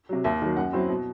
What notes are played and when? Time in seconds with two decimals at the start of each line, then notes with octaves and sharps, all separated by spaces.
0.09 C3 F#3
0.24 D#2 E5
0.42 D#3 F#3
0.57 F#2 F#5
0.73 F#3 C4 E4
0.89 B2